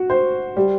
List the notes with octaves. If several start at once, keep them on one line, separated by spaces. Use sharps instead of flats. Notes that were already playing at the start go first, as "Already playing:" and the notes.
Already playing: F#4
C5
G3